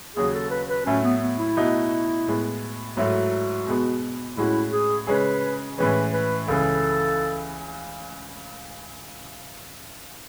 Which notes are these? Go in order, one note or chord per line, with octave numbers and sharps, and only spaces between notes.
D#2 C#3 F#3 G#4
A4
B4
B4
A2 F#3 A3 C#4
B3
B3
E4
B2 A3 D#4 F#4
A2 G#3 B3
G#2 F#3 A3 E4 F#4 A4
B2 G#3 B3
A2 G#3 C#4 E4 F#4
G#4
C#3 G#3 C#4 G#4 B4
A2 E3 G#3 C#4 B4
B4
C#2 C#3 E3 A4